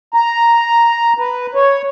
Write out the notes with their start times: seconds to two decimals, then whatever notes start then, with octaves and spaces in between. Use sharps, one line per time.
0.14 A#5
1.18 B4
1.55 C#5